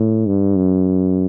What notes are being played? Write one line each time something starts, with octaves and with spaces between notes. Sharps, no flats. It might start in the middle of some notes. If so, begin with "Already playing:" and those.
Already playing: A2
G2
F#2